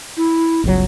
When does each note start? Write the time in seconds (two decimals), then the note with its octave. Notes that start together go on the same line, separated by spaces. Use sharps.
0.17 E4
0.64 G1 C#2 F#3